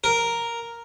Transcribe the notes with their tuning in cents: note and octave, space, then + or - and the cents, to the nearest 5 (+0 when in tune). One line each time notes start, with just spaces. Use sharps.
A#4 +0